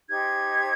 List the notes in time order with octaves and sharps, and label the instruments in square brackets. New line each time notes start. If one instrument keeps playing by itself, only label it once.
[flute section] D#4 G4 C5 G#6